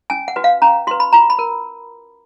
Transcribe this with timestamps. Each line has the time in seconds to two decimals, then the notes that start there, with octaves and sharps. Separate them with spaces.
0.10 C#4 G#5
0.28 F#5
0.36 F#4 B4
0.44 F5
0.62 C#4 A#5
0.87 F#4 B4 C6
1.00 B5
1.13 F4 A#5
1.30 B5
1.39 A#4